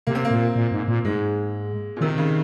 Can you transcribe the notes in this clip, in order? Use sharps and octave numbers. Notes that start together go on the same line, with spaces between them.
C3 A#3
C4
A#3
A#2
A#2
G#2
A#2
G#2 G#3
A#2
C3 D#3
C#3